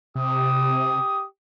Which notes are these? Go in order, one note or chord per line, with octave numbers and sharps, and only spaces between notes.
C3 G4 D#6